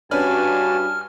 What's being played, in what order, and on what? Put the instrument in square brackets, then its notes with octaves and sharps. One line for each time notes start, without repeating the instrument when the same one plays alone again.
[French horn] G2 [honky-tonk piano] C#4 D4 B4 [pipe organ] F#4 G#5 A5 [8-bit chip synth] F6